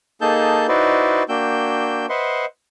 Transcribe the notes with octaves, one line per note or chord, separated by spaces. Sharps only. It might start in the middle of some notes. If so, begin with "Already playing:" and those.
A#3 D#4 G#4 A4 A5 G6
D#4 E4 F#4 B4 C5 D5
A#3 D4 F#4 G5 E6 G6
B4 C5 D#5 E5 F#5 C6